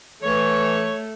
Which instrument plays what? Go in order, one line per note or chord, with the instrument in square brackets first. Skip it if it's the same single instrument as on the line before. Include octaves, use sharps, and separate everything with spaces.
[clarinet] E3 [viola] A3 [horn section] C#5